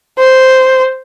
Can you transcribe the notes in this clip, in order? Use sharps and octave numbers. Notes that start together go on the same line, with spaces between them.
C5